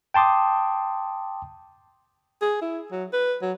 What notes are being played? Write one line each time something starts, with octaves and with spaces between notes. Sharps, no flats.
G5 A5 C6 D6 D#6
G#4
E4
F#3
B4
F#3